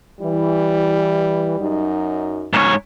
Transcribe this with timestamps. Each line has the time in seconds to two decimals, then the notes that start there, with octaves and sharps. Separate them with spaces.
0.20 E3 G3
1.59 F#2 F#3 D#4
2.53 G#2 C#5